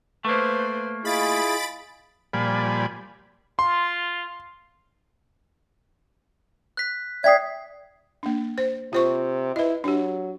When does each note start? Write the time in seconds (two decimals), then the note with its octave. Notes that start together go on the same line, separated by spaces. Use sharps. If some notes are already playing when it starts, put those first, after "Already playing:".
0.25 A3 A#3 B4 C5
1.05 E4 F4 G#4 D#5 G#5 B5 A6 D7
2.33 A#2 F3 G3 D5 G#5 B5
3.59 F4 C6
6.77 F#6 B6
7.24 D5 E5 G5 D#6 G#6 B6 C7
8.23 A#3 D4
8.58 C5
8.93 C3 F4 C5 C#6
9.56 E4 B4 D#5
9.84 F#3 D4 G4